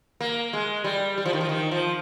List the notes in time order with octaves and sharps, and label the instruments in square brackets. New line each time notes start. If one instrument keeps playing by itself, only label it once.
[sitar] A#3
G#3
G3
G3
F3
D#3
F3
D#3
F3